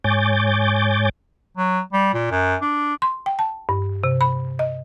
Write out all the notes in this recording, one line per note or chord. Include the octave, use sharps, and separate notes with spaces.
G#2 C#5 G#5 D6 G6 A6
F#3
G3
A#2
F#2
D4
C6
G5
A5
G2
C3
B5
D#5